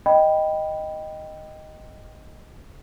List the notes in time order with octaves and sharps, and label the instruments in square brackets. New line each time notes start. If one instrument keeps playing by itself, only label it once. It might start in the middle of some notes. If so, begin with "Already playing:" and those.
[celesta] D#5 G5 B5